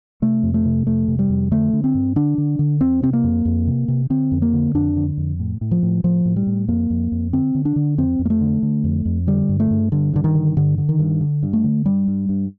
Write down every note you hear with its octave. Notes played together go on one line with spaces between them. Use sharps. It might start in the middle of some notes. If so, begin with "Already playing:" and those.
C3 A3
F2
A3
C3
F2 A3
C3
G3
F2
D3 A3
D3
C4
G2
D3 D4
D3
D3
F2 C4
C3 C4
A#3
F2
F2
C3
C3
D3 C4
F2
A#3
D3
F2 D4
D3
F2
A2
A2
F3
A2
A2 F3
A2
G3
A2
F2 A#3
F2
F2
D3 C4
D3
D4
D3
F2 C4
F2
A#3
A3
D3
D3
F2
F2
D3 G3
G2
A3
G2
G2 D3
G2 D3
D#3
D3
G2 D3
D3
D#3
G2
D3
G2
A3
D3
G2 G3
G2
G2